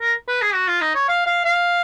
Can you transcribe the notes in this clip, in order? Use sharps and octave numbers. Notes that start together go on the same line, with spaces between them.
A#4
B4
G#4
F#4
F4
D#4
C#5
F5
F5
F5